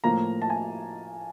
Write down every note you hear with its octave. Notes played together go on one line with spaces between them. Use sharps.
A2 F3 A#3 A#5
A5
G#5